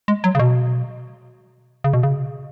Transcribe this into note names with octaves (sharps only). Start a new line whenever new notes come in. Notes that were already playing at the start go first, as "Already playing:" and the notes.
G#3
F#3
C#3
B2
C#3
B2
C#3